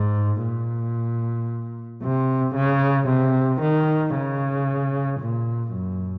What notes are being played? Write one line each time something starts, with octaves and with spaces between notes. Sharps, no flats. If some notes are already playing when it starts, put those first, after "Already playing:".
Already playing: G#2
A#2
C3
C#3
C3
D#3
C#3
A#2
F#2